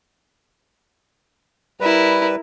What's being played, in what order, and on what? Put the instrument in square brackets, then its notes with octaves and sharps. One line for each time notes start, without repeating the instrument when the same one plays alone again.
[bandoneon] G3 B4 [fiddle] E4 A#4